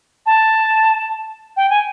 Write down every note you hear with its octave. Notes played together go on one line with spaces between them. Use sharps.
A5
G5
G#5